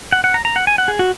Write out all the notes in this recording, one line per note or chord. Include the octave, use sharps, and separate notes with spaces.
F#5
F#5
A#5
A#5
F#5
G#5
F#5
G#4
F#4